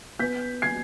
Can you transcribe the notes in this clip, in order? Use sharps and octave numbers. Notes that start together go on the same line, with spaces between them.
B3 G6 B6
G#6 C7